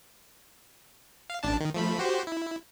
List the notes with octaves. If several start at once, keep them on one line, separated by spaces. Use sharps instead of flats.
F5
A1 D4 A5
D#3
F3 A3 B5
F#4 G4 C5
E4